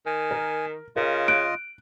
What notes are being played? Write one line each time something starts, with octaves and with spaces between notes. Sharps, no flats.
D#3 G#5
A#4
C#3 F4 A#4 D#5
F#6 D7